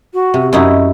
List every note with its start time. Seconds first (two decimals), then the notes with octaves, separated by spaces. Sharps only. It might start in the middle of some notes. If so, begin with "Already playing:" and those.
0.14 F#4
0.34 C3
0.53 F#2 D#4 E4 F#4